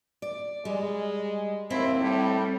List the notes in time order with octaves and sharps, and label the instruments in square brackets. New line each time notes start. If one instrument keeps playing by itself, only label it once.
[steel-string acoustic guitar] D5
[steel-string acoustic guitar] G3 [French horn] G#3
[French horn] D#2 [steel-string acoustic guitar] C4 [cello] E4
[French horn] A2 [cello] G3